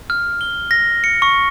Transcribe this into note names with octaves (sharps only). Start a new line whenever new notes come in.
F6
G7
A#6
C#7
C#6